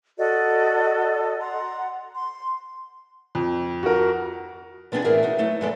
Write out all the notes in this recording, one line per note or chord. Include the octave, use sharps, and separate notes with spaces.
F#4 A4 D5 D#5
F#5 A#5 C6
C6
F2
F#4 A#4
F3 B3 C4 D4 G#4
A2 E3 G#4 A#4 D5 E5
D#4 F#4
F#3 A3 D#4
G2 F3 G#3 B3 A4 D5